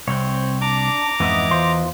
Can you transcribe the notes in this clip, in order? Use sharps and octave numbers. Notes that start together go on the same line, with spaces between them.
C2 C4 C#5
D4 A#5 D6
F2 G#2 E3 B3 D#5 E5
E2 F4 C5